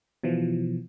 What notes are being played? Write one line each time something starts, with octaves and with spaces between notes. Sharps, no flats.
B2 E3 F3